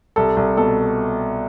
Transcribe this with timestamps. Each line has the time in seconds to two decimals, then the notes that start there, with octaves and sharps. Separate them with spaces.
0.16 C2 A4
0.37 C2
0.57 B2 A4